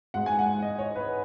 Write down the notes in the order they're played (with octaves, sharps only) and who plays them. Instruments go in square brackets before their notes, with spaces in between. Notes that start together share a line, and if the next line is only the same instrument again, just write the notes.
[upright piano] G#2 G#3 F#5
G#5
F#5
D#5
C#5
B4